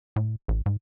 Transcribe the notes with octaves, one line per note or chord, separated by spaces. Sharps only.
A2
A1
G#2